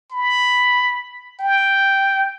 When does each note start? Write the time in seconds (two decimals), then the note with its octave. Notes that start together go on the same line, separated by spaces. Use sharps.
0.12 B5
1.40 G5